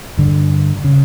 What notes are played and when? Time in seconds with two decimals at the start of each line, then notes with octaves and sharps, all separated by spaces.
0.18 G2 D3
0.84 C#3